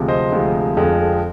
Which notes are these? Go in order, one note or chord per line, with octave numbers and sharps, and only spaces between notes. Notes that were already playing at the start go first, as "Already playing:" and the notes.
Already playing: D2 C3 F3 G#3
C5 D#5
D2 C3 F3 G#3
F2 D3 F3 G#3